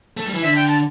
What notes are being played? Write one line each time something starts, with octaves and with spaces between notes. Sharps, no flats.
A3
G3
E3
D3 E5
G5
A5